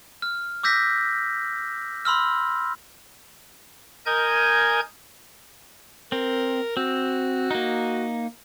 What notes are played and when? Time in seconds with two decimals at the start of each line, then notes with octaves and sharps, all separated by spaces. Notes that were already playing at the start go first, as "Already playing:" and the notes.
0.22 F6
0.63 D6 E6 G6 A#6 B6
2.05 B5 C6 E6 F6
4.06 A#4 D#5 G#5 G6 G#6
6.12 C4 A#4
6.77 C4 F#4
7.51 A#3 D#4